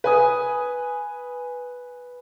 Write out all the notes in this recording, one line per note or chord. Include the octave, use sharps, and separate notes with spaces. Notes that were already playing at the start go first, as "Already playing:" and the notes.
B4 G#5 D#6